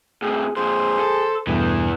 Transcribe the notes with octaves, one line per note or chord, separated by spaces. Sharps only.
A2 C3 G#4
F2 A#2 G#4 C5
A4
E2 G2 B2 E3 A3 B3